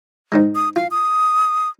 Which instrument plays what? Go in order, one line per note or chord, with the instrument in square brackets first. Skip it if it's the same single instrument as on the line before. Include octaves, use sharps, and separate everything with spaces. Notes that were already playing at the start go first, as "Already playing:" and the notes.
[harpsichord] G#2 D#3 G#3
[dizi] D#6
[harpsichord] F4 [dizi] F5
[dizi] D#6